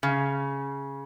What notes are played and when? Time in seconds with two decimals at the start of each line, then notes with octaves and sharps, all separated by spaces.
0.03 C#3